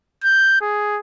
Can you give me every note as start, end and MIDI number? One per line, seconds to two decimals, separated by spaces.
0.24 0.56 91
0.61 1.00 68